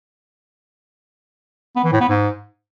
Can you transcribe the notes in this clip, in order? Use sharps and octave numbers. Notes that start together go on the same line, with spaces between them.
B3
E3
A2
B3
G#2